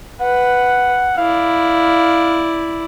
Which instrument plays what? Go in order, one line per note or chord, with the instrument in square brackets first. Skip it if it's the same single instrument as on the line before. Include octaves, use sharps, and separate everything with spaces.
[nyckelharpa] B4 [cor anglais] F#5
[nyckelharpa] E4 D5 [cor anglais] F5